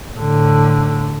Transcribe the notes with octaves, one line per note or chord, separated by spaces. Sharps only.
A2 D3